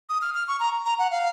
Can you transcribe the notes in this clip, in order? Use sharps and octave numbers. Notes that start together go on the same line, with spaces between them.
D#6
F6
F6
C#6
A#5
A#5
F#5
F5